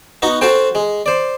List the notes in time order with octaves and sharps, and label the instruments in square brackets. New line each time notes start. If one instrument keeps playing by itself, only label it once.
[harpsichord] B3 D#4 F#4 C#6
C4 F#4 A4 C5 G5
G#3
C5 D5